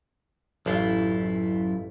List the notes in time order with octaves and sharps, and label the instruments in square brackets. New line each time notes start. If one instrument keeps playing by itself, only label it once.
[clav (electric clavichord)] A1 [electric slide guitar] F#2 E4 F4